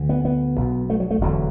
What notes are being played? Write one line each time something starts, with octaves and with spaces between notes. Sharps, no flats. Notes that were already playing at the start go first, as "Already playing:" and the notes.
Already playing: D2 D3
B3
B3
B1 B2
A3
F#3
A3
E1 E2 D3 F#3